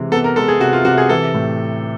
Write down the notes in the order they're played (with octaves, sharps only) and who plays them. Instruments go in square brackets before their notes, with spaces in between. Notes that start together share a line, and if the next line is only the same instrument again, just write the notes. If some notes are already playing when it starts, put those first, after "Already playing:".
Already playing: [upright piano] C3 E3 G#3
[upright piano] B3 [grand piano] A4
[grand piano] A#4
[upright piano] G#3 [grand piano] A4
[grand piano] G#4
[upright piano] C3 [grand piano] F#4
[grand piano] F4
[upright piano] C3 [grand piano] F#4
[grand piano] G#4
[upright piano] E3 [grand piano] A4
[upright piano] A2